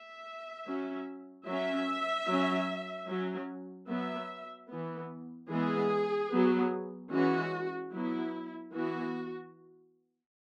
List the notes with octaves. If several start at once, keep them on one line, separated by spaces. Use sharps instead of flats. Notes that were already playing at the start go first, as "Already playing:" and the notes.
Already playing: E5
F#3 C#4
F#3 C#4 E5
F#3 C#4
F#3 C#4
F#3 B3 E5
E3 B3
E3 G#3 B3 G#4
F#3 B3
E3 G#3 C#4 F#4
F#3 B3 E4
E3 B3 F#4